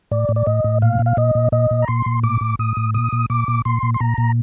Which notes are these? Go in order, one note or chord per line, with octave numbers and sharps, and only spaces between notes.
A2 D5
A2
D5
A2 D#5
A2
A#2 F5
A#2
F5
A#2 D#5
A#2
A#2 D#5
A#2
A#5
A#2 C6
A#2
A2 D6
A2
A2 D#6
A2
A#2 D#6
A#2
A#2 D6
A#2
A#2 C6
A#2
C6
A#2 A#5
A#2